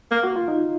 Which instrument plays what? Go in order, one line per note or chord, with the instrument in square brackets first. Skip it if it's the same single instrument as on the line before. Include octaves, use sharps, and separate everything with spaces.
[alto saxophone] A#3
[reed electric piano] F#4
F4
D#4